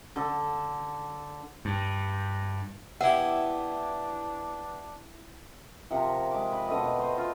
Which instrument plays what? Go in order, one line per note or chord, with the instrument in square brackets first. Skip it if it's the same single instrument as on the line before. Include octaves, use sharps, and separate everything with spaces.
[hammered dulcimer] D3 A4
[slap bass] G2
[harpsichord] B3 G4 [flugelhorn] D4 [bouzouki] E4 E5 [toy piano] F#5
[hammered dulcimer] C3 F3 A#4 F#5
G#3 D6
B4
B2 D3 A3 D#5
C5 D#5
F4